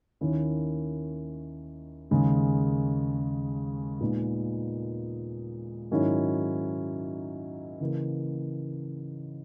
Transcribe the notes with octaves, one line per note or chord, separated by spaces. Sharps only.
D#2 D#3 A#3 C#4 E4
D#2 C#3 G#3
A#2 G#3 B3 D#4
G#2 D#3 F#3 C#4 E4
C#3 E3 A#3